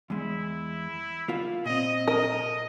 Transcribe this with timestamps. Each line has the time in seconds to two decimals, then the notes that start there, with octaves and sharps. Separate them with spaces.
0.10 E2 G#3 E4
1.28 A#3 F4 F5
1.65 A#2 C4 D#5
2.08 A#4 D#5